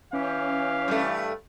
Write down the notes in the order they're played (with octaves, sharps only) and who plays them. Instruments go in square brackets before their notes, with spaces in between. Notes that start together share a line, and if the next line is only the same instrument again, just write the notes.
[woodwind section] E3 G4 [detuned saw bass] C#4 [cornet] F5
[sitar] G2 A3